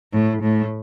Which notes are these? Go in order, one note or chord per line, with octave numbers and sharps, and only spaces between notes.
A2
A2